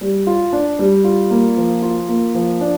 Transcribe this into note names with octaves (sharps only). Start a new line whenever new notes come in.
G3
F4
D4
G3
F4
A#3
F3
F4
A#3
F3
D4